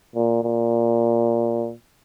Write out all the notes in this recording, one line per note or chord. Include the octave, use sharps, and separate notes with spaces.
A#2
A#2